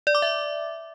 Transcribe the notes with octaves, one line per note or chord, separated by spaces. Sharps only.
D5
D6
E5